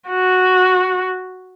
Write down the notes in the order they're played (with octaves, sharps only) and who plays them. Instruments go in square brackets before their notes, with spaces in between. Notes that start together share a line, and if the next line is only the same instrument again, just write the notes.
[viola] F#4